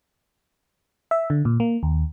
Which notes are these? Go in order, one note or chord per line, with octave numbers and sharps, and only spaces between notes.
E5
D3
A#2
A#3
D#2